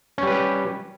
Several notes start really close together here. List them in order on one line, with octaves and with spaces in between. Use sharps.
C#4 G3 B4 G4